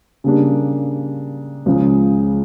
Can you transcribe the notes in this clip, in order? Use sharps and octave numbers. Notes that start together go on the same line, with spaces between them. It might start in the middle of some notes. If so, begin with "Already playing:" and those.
C#3 G3 A#3 D4
C#2 C#3 F3